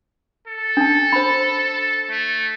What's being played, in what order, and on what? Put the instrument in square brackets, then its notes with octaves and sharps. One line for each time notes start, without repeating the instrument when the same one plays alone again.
[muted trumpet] A4
[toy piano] D4 A5
C5 B5
[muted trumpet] A3